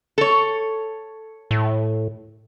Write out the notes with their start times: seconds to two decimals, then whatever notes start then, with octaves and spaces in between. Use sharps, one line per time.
0.18 A4 C#5
1.51 A2